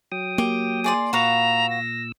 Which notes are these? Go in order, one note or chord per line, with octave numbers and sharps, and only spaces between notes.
F#3 G5 D#6
A#3 G4
G#4 D5 C6
A#2 F#4 B4 F5 A#5 E6
A#6